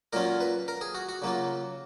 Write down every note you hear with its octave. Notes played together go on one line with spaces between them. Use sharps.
A#2 F#3 C#4 F4 A#4
B4
A#4
G#4
F#4
F#4
C#3 F#3 A#3 F4